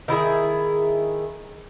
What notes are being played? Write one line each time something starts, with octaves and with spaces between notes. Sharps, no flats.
D#3 E4 G4 G#4